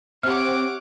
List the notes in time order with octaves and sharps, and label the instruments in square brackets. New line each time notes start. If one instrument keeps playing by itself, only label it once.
[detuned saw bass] C4 [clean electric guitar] G4 E5 [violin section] C#5 F#5 D6 [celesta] F6